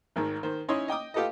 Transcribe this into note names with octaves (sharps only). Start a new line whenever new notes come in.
G#1 G#2 D#3
D#3 C5
C#4 D#4 E4 C#5 C6
D#5 G5 D6 D#6
F4 G4 A4 B4 D#5